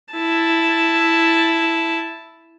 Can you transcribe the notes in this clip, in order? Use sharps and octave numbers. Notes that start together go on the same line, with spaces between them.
E4 A5